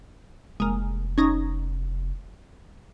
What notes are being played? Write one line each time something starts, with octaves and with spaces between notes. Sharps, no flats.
F1 G#3 A#3
C#4 D#4 A#5